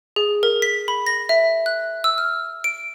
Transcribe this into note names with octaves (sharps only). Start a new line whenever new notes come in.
G#4
A#4
B6
B5
A#6
E5
F#6
E6
F6
D7